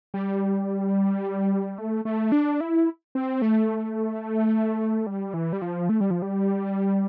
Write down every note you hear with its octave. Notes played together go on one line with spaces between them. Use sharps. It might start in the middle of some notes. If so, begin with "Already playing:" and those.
G3
A3
A3
D4
E4
C4
A3
G3
E3
G3
F3
A3
G3
F3
G3